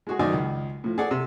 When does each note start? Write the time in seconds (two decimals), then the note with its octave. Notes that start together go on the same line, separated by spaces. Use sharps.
0.07 G#3 F#4 G#4
0.19 F#2 D#3 D#4 D5 G#5
0.33 C#2
0.84 A2 F3
0.98 G#4 A4 D5 F#5
1.11 C3